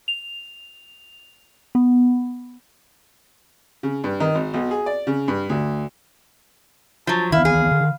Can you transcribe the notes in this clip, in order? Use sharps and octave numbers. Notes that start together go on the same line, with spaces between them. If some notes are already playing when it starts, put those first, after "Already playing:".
F7
B3
C#3
G2
D#3
G#1
B1
G#4
D5
C#3
G2
D2
F3 F#3 A5
D#3 E3 B3 E4 F5
G#4
D3 D#3